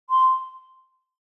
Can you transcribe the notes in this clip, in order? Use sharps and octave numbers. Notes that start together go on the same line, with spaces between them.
C6